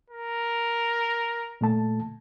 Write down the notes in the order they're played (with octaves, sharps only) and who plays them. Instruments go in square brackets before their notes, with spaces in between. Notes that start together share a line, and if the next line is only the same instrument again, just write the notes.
[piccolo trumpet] A#4
[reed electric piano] A#2 A3 A5